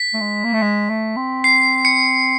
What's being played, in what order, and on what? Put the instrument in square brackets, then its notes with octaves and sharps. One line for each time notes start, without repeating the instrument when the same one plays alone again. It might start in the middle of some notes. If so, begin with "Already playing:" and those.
Already playing: [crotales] B6
[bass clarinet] A3
G#3
A#3
A3
G#3
A3
C4
[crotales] C7
C#7